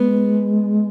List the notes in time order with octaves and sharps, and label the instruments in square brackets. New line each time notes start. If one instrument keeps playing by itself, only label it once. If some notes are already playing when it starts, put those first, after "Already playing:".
Already playing: [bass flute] G#3 [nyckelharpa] B3